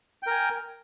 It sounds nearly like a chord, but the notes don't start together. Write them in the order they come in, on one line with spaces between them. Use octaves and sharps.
G5 A#4 G#5